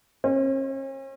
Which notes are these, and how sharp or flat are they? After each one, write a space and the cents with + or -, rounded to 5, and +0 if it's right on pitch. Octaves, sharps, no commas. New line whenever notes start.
C#4 -45